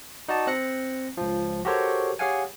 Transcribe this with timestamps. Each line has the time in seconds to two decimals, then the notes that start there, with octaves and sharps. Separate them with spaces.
0.28 D#4 F#4 D5 A5
0.47 C4 F#6 A#6 C#7
1.17 C#2 F3
1.65 F#4 G4 A4 A#4 C5 C#5
2.19 G4 G#4 C#5 F5 F#5 G#5